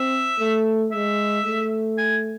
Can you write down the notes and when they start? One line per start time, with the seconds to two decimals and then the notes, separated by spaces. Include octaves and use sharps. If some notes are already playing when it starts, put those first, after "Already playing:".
Already playing: C4 E5
0.39 A3
0.92 G#3 E5
1.46 A3
1.98 G#5